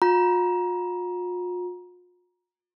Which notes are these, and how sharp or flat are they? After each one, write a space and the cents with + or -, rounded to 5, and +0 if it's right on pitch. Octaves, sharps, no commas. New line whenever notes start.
F4 +45 A#5 +25